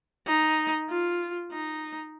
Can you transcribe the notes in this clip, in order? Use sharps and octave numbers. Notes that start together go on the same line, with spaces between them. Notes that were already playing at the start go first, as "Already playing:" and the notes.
D#4
F4
D#4